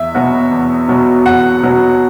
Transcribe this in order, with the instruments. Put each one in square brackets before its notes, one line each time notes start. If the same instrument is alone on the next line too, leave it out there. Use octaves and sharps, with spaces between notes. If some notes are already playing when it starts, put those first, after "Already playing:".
Already playing: [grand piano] E2 [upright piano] E5
[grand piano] B2 F#3 B3 F#4
E2
B2 F#3 B3 F#4
[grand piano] E2 [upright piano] F#5
[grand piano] B2 F#3 B3 F#4